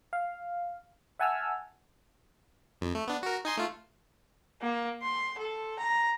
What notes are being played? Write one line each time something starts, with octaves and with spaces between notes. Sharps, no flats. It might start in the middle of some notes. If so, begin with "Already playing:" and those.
F5
E5 F#5 G#5 A5 E6 F6
F2
A3
B3 D4
F#4 A#4
D#4 G#5 C6
A3 F4
A#3
C6
A4
A#5